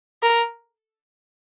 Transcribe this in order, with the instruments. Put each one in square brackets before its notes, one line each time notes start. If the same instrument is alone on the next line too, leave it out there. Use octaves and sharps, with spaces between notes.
[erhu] A#4